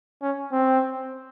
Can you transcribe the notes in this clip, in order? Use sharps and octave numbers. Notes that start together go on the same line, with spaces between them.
C#4
C4